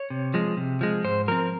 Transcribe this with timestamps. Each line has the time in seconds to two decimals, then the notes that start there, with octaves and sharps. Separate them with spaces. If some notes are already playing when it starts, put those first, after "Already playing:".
Already playing: C#5
0.10 C3
0.34 F3 G#3
0.57 C3
0.81 F3 G#3
1.04 G#2 C5
1.28 F3 C4 A#4